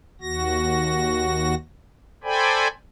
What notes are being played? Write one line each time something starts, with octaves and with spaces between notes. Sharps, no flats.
D#2 F#4 A#6
A4 C5 D5 G5 G#5 B5